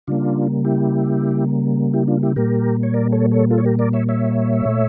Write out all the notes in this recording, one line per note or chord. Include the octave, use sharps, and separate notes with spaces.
C#3 G3 A#3 D4 F4
E4 G4
E4 G4
D4 F4
E4 G4
A#2 G3 A#3 G4 A#4
C#5
A#4 D5
A4 C#5
A4 C#5
F4 A4
C#5
G4 A#4
A#4 D5
C#5 E5
C#5 E5
A#2 A3